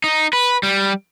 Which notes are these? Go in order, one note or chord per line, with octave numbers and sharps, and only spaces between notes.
D#4
B4
G3